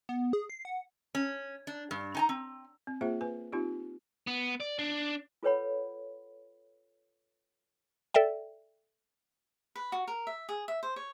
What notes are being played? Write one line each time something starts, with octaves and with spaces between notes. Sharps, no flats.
B3
G#4
C7
F#5
C#4
D4
G2
D#4 G#5 A#5
C4
C4
A#3 F4 G#4 C5 E5
B4 G#5
C4 D#4 F4 G4
B3
D5
D4
F4 A4 B4 C#5 F#5 B5
A4 D5 E5 G5
B4
F#4
A#4
E5
G#4
E5
C5
C#5